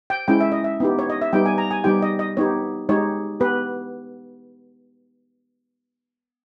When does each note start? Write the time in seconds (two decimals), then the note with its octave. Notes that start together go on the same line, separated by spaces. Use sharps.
0.10 G5
0.28 G#3 C#4 E4 G5
0.41 E5
0.52 D#5
0.64 E5
0.80 B3 D#4 G4
0.99 C#5
1.10 D#5
1.21 E5
1.33 G3 B3 D#4 G4 G5
1.46 G#5
1.58 A#5
1.71 G#5
1.84 G3 B3 D#4 G4 G5
2.02 D#5
2.19 D#5
2.37 B3 D#4 G4 C#5
2.89 G#3 D#4 G4 C#5
3.40 B3 G4 B4